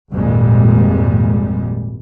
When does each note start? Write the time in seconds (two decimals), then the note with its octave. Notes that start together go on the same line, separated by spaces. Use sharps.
0.12 G#1 F2 A#2 G3 G#3